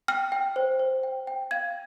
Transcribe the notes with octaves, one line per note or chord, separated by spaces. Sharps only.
G5 F6
G5
C5
C5
G5
G5
F5 G#6